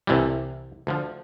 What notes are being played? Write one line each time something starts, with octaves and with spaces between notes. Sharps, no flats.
C2 C3 E3 G3
D2 D3 F3